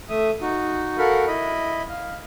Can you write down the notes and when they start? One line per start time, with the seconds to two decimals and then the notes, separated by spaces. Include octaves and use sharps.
0.09 A3 E5 D#6
0.41 D#4 F#4
0.98 F#4 A4 A#4 F5 F#5 B5
1.27 E4 D#5 B5
1.89 F5